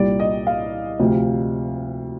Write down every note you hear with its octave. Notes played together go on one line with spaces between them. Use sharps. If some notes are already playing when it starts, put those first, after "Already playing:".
Already playing: C2 A#2 G3 D5
D#5
F5
D2 C3 F3